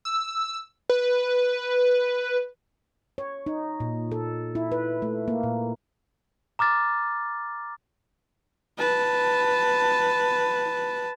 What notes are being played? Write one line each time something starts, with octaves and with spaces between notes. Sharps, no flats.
E6
B4
C#5
D#4
A#2
A4
E4
B4
A3
A#3
A#2
A#5 D6 F6 A6
B4 A5